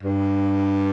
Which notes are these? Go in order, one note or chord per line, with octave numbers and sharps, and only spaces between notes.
G2